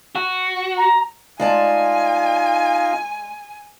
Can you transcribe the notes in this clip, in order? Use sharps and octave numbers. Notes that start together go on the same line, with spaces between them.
F#4
A#5
G#3 D#4 F4 D5 G#5 A5